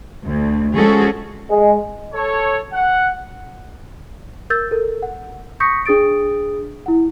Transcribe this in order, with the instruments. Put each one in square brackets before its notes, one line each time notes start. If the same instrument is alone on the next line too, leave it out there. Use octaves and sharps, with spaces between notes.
[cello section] D2
F3 G#3 C#4 F#4 G#4 A4
[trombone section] G#3
[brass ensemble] A4 C#5
F#5
[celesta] A#4 E6 G6 A6
A4 A#4
F#5
C#6 D#6 G6 A#6 B6 C#7
D4 G#4 D#6 A6 D7
E4 F#5